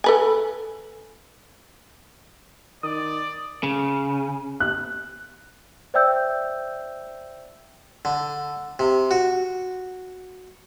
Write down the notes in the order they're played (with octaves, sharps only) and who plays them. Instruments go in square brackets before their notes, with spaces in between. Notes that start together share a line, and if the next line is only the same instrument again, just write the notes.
[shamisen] A4 B4 G#5
[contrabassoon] D#3 [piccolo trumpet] D5 [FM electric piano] D#6
[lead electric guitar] C#3
[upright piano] F#6
[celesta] C5 D5 E5 G5 E6 G6
[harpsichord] D3
C3
F#4